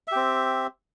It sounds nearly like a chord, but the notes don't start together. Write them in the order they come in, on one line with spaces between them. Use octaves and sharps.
E5 G4 C4